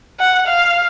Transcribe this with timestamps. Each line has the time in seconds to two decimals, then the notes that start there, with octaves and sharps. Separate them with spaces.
0.20 F#5
0.47 F5